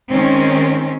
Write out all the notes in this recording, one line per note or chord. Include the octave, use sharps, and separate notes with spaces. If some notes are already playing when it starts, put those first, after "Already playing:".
D#3 G#3 C4 C#4